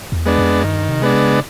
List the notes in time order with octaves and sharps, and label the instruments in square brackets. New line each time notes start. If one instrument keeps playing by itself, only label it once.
[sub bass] E2
[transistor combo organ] G#3 B3 D4
[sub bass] F2
[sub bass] G2 [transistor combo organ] D#3
[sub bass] C3
[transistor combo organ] G#3 B3 D4
[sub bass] C#3